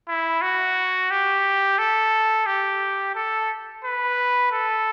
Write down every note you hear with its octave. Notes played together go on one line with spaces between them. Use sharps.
E4
F#4
G4
A4
G4
A4
B4
A4